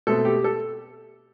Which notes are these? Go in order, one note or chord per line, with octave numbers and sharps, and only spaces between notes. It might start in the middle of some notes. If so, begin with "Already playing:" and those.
B2 A3 C4 A4
G4
A4